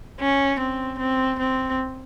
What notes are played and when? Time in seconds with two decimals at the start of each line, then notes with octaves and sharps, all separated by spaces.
0.19 C#4
0.59 C4
0.99 C4
1.39 C4